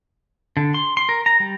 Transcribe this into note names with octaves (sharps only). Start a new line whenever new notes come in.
D3
C6
C6
A#4
A#5
G3